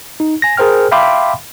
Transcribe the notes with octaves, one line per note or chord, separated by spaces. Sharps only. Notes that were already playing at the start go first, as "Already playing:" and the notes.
D#4
G#5 A#6
G#4 A#4 C5 G5 F6
E5 F5 G5 B5 C6 D6